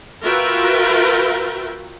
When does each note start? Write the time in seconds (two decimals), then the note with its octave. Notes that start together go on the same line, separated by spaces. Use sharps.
0.23 F4 F#4 A#4 B4 E5 G5